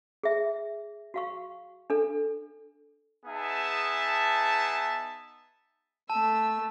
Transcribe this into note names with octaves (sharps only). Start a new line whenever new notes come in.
G#4 E5
F#4 F5 C#6
D4 A4
B3 D#4 G#4 E5 A5
A3 A5 E6